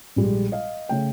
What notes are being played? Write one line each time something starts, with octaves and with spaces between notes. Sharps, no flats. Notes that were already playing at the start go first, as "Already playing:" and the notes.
A#1 G3 G#3
D#5 F5
C#3 A3 G5